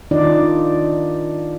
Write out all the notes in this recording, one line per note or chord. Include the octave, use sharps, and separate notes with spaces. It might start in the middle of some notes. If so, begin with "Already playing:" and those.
D#3 D4 D#4 F4 D5